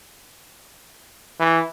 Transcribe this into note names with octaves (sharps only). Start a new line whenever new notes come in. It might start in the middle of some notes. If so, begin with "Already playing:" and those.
E3